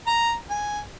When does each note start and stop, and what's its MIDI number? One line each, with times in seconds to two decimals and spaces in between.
0.07 0.33 82
0.50 0.80 80